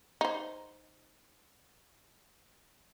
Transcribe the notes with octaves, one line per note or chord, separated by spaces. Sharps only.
D#4 C5